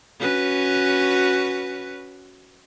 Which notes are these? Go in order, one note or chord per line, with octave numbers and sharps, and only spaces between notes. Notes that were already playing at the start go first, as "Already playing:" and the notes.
C#4 F#4 B4